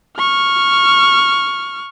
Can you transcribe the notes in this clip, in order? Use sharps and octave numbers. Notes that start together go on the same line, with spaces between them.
C#6 F6